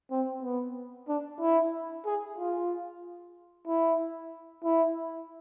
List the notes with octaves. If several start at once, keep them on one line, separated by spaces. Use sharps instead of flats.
C4
B3
D4
E4
G#4
F4
E4
E4